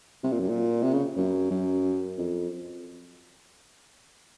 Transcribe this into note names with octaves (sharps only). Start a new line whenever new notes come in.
C3
A#2
F#2
A#2
C3
C#3
F#2
F#2
F2